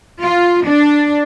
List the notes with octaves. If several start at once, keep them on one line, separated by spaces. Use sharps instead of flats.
F4
D4